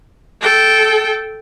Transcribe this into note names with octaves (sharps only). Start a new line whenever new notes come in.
A4 G5